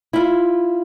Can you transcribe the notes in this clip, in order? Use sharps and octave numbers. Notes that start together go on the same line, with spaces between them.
E4 F4